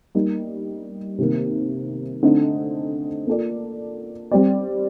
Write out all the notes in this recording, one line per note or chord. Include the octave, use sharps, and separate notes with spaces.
G3 A#3 D#4
C3 D#3 A#3
D3 A3 C4 D#4
A#3 F4 A4 D5
G3 C4 G4 D5